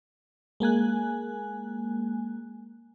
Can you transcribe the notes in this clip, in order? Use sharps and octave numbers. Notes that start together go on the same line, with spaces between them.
G#3 A#3 G#5 F#6